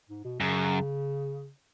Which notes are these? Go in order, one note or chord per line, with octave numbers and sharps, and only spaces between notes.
G#2
B2
F#2 C#3